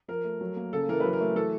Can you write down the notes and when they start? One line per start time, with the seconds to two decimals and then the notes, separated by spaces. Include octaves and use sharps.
0.08 F3 A#4
0.24 A3
0.41 F#3
0.56 A#3
0.73 C#3 A4
0.89 E3 A#4
1.00 F#3 B4
1.13 A#4
1.21 A3
1.36 E3 A4